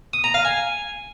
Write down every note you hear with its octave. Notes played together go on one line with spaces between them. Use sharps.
D#6
A#5
F5
G#5